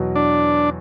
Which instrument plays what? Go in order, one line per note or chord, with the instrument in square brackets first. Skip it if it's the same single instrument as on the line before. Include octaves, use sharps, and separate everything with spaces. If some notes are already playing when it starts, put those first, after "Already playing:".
Already playing: [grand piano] E2 B2 F#3
[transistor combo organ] D4